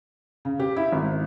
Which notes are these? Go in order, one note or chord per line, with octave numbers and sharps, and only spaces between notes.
C#3
G4
E4
G#1